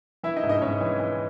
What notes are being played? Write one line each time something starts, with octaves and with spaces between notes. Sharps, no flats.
E3 E4 E5
D#4 D#5
G#2
D#4 D#5
G#2 C#4 C#5
E3
E3